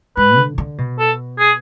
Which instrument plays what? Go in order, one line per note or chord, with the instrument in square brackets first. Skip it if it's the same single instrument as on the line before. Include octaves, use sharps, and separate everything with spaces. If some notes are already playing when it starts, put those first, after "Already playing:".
[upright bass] G#2 [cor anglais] B4
[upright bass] D3
D3
B2
[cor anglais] A4
G#4